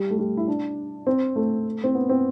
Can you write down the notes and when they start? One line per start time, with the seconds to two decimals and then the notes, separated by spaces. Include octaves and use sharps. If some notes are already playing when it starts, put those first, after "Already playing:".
Already playing: G3
0.10 A3
0.19 G3
0.37 E4
0.48 D4
1.07 C4
1.36 A3
1.84 C4
1.95 B3
2.09 C4